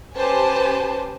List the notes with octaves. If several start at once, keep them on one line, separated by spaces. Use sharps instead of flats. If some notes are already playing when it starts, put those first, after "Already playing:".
C#4 G4 B4 C5 G#5 A5